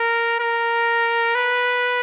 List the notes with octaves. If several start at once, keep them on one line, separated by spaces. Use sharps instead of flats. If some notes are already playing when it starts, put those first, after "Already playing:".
Already playing: A#4
A#4
B4